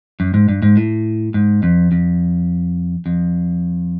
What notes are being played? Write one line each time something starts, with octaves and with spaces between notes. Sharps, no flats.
F#2
G#2
G2
G#2
A2
G#2
F2
F2
F2